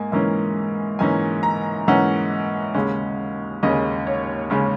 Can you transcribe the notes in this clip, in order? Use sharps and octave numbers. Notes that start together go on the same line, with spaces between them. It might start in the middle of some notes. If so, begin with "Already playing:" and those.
Already playing: G#2 A#3 G#5
G#2 E3 A#3 C#4
G#2 E3 A#3 C#4 G#5
A#5
G#2 E3 A#3 C#4 F#5
D#2 C#3 G#3 C#4
D#2 C#3 G#3 C#4 D#5
C#5
C#3 G#3 C#4